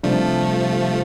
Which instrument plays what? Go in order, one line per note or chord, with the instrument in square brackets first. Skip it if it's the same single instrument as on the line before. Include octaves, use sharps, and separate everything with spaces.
[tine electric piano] C3 G3 D4 [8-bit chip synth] F3 A3